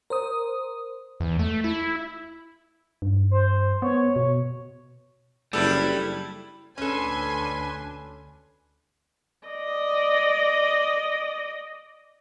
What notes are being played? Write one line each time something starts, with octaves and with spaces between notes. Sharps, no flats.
A#4 C5 D#6
E2
A3
E4
G2
C5
B3 C#5
B2
F#1 G3 D4 E4 A4 B4 D5
D2 C#4 D4 A4 B4 G#5 C6
D5 D#5